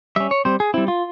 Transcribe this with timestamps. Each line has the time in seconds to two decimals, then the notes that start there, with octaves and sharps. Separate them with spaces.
0.16 G3 C#4 E5
0.31 C#5
0.45 G3 C4 C5
0.60 G#4
0.74 G3 C4 E4
0.88 F4